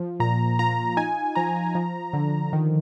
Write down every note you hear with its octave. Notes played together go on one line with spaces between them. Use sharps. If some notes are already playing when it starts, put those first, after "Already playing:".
Already playing: F3
A#2 A#5
F4 A#5
D#4 G#5
F3 A#5
F3
D3
D#3